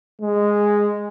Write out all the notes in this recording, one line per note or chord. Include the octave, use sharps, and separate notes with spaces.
G#3